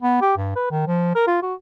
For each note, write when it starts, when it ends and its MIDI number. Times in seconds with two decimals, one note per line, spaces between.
0.02 0.19 59
0.21 0.34 67
0.37 0.53 43
0.56 0.68 71
0.71 0.84 51
0.87 1.12 53
1.15 1.24 70
1.27 1.40 65
1.42 1.54 66